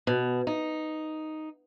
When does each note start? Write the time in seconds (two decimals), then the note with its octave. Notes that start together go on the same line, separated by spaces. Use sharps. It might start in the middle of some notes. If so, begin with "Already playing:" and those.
0.07 B2
0.47 D#4